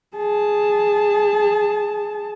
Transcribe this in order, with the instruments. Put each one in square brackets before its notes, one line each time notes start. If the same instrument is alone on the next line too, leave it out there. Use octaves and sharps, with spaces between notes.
[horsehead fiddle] G#4 A5